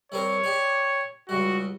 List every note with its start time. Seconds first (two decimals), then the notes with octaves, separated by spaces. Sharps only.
0.12 G3 C4 A#4 C#5
0.44 G4 D5
1.29 C#2 G3 F#4